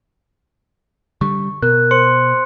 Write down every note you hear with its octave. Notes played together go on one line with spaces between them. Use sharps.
D3 G3 C#6
B2 A#4 F#6
C5 C6 C#7